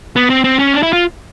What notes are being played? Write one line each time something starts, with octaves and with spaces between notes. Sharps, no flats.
B3
C4
C4
C#4
D4
E4
F4